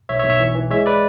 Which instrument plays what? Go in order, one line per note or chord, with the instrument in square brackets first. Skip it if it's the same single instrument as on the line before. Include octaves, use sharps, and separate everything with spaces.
[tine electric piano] B1 C#5 E5
C#5 E5
B1
C#5 E5
E3
E3
G#3 C#5 E5
B4 D5